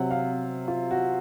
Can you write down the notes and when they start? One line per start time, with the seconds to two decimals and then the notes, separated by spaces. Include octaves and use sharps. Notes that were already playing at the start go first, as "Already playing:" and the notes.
Already playing: C3 F#3 F#5
0.11 F5
0.68 F4
0.91 F#4